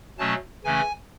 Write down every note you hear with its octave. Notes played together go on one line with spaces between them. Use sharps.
B2 F#3 A3 C#4 A5
C#3 E3 A3 C#4 G#5